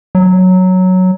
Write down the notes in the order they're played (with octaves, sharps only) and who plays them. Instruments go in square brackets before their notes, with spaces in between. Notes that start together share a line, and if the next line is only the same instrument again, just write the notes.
[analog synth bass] F#3